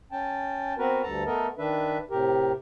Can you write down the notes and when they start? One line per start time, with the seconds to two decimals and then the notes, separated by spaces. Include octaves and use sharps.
0.12 C#4 G5 A5
0.78 B3 C4 F#4 A#4 B4
1.03 D2 G2 A4 A5 A#5
1.26 A3 B3 A4 A#4 D#5
1.58 D#3 D4 B4 E5
2.10 A2 C3 G4 A#4